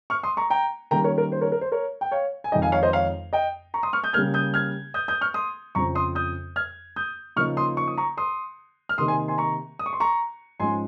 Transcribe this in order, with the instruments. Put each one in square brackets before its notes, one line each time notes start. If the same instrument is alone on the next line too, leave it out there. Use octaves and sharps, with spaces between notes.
[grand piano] C#6 F6
C6 D#6
A#5 C#6
G5 A#5
D#3 G3 A#3 C#4 G5 A#5
A#4 C#5
A#4
C5
A#4 C#5
A#4
C5
A#4 C#5
G5
C#5 F5
G#5
F2 D#3 G#3 D#4 D#5 G5
F5 G#5
C#5 F5
C5 D#5
C#5 F5
D#5 G5
A#5 C#6
C6 D#6
C#6 F6
D#6 G6
C#3 G3 A#3 F6 G#6
D#6 G6
F6 G#6
D#6 G6
D#6 G6
C#6 F6
C6 D#6
F2 C#3 F3 C4 A#5 C#6
C6 D#6
D#6 G6
F6 G#6
D#6 G6
C#3 F3 A#3 D#4 C#6 F6
C6 D#6
C#6
D#6
A#5 C#6
C6 D#6
F6
C3 D#3 A#3 D#4 C6 D#6
G#5 C6
G#5 C6
A#5 C#6
D#6
C#6
C6
A#5 C#6
G#2 F3 G#3 C#4 G#5 C6